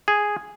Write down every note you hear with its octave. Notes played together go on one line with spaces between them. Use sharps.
G#4